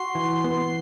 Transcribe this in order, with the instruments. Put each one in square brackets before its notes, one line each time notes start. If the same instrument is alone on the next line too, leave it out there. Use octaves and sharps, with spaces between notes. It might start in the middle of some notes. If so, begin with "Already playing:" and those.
Already playing: [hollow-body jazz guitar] F#4 [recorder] C6
[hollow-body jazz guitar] E3
B3